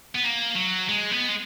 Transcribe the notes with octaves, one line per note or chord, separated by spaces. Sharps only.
B3
A#3
F#3
G#3
B3
G#3